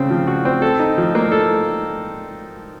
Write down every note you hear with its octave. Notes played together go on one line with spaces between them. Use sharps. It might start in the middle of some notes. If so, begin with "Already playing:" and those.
Already playing: C#3 C4
F3
F#4
C4
A4
D#4
F3
A#3
A4